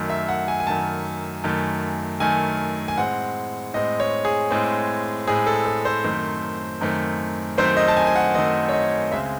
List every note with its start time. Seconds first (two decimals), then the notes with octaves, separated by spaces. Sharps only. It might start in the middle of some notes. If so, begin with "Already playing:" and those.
Already playing: F#2 D#3 A3
0.10 E5
0.29 F#5
0.48 G#5
0.60 G#5
0.67 F#2 D#3 A3 A5
1.44 F#2 D#3 A3
2.20 F#2 D#3 A3 G#5
2.88 G#5
2.97 A2 G#3 C4 F#5
3.74 A2 G#3 C4 D#5
4.00 C#5
4.25 G#4
4.51 A2 G#3 C4
5.27 A2 G#3 C4 G#4
5.47 A4
5.66 A4
5.85 C5
6.04 F#2 D#3 A3 C4
6.81 F#2 D#3 A3 C4
7.58 F#2 D#3 A3 C4 C5
7.77 D#5
7.88 A5
7.96 G#5
8.07 G#5
8.16 F#5
8.34 F#2 D#3 A3 C4 D#5
8.69 C#5
8.73 D#5
9.11 C#2 C#3 G#3 C4 E5